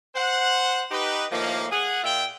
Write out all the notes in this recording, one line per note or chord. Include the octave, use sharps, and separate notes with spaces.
C5 F#5
D#4 G4 B4
A2 D#3 F3 A#3
G#4 F#5
A#2 F4 E5 G5